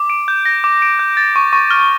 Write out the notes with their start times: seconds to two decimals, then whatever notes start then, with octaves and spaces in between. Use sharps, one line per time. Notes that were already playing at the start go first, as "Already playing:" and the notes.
Already playing: D6
0.10 D7
0.28 G6
0.45 A#6
0.64 D6
0.82 D7
0.99 G6
1.17 A6
1.36 C#6
1.53 C#6
1.71 F6